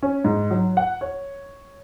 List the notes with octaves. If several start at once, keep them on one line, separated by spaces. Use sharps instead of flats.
C#4
G#2
F#3
F#5
C#5